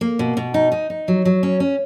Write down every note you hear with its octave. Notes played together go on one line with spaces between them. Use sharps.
A#3
B2
B2
D#4
D#4
D#4
F#3
F#3
C#4
C#4